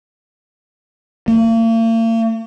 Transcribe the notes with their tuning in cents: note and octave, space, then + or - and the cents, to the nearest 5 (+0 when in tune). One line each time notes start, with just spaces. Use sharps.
A#3 -45